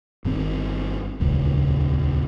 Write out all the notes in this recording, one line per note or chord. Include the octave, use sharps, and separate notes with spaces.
G1 D#3 C4
D#1 G#1 C#2 C#3